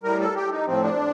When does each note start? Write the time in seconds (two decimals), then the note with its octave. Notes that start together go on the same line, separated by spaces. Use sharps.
0.03 A2 G3 A#4
0.20 A4
0.36 G4
0.51 D#4
0.67 A2 F3 C4
0.83 D4